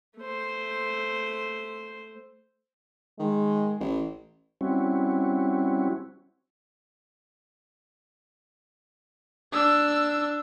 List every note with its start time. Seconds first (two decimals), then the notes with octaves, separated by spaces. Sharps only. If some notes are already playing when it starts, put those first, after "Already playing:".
0.17 A3 C5
3.19 D#3 G#3
3.80 A1
4.61 G3 C4 C#4 E4 F#4
9.52 D4 E6